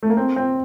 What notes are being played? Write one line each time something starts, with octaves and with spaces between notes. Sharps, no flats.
A3
A#3
C4
C4